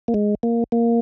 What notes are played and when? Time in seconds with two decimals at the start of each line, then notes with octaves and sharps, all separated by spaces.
0.08 A#3
0.14 G#3
0.43 A#3
0.72 A#3